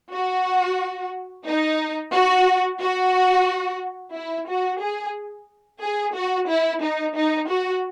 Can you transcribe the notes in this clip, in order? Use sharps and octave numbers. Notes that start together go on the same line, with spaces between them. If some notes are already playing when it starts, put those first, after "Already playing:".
F#4
D#4
F#4
F#4
E4
F#4
G#4
G#4
F#4
E4
D#4
D#4
F#4